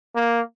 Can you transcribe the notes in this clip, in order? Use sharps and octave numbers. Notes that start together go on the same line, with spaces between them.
A#3